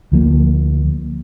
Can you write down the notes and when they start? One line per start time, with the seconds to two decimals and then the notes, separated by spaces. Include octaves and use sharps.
0.12 D2 F3 A#3